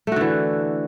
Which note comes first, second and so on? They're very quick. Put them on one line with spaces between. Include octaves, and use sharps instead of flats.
A3 F#4 D3 E3